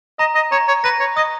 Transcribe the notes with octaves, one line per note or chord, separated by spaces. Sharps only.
D#5 A#5
D#5
C#5 A#5
C#5
B4 A#6
C#5
D#5 D#6